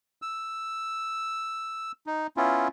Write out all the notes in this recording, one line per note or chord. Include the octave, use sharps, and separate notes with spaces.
E6
D#4
B3 C#4 E4 F4